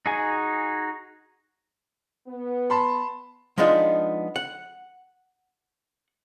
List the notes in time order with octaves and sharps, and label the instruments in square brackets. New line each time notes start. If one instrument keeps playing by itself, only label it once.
[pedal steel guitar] D#4 F#4 G#4 G#5
[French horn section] B3
[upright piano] A5 B5 C6
[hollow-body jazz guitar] F3 G#3 B3 D4 D#4 F4
F#5